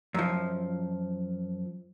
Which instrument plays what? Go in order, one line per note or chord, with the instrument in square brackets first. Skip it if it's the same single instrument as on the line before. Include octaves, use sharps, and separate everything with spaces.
[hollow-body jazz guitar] F#2 F3